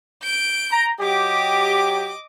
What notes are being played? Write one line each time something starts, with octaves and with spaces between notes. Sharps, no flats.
G6 D7
A#5
F#3 G4 D#5 D6